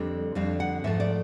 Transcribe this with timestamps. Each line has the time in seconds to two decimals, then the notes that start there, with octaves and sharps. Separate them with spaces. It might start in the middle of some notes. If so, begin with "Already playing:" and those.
Already playing: F2 D3 G3 C4
0.35 F2 D3 G3 C4 F5
0.60 F#5
0.84 G#2 F3 A3 E5
1.00 D5